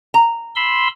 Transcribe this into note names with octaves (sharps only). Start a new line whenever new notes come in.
A#5
B5 C6 E6